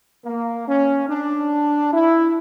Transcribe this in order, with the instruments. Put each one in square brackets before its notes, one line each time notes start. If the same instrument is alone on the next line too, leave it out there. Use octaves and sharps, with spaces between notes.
[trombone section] A#3
C#4
D4
E4